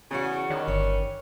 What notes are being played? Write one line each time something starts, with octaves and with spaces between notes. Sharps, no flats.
E2 C#3 F#4
D#3 G3 C#4 D4
G1 C#5